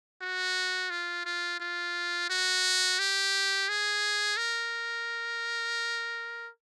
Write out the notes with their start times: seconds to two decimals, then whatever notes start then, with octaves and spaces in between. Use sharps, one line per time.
0.22 F#4
0.90 F4
1.25 F4
1.60 F4
2.30 F#4
2.99 G4
3.69 G#4
4.37 A#4